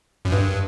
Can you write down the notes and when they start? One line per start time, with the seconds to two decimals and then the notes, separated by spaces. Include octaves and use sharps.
0.25 F#2
0.32 G2